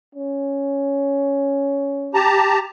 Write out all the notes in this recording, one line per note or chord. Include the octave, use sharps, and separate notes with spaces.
C#4
G4 A5 A#5